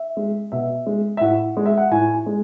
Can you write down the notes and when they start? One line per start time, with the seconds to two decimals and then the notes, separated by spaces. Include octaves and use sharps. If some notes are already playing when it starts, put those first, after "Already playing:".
Already playing: E5
0.17 G#3
0.52 B2 E5
0.87 G#3
1.17 E5
1.21 A2 F#5
1.57 G#3
1.66 E5
1.78 F#5
1.91 A2 G#5
2.14 G#5
2.26 G#3